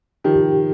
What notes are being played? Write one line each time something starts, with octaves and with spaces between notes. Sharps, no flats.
D#3 F3 G4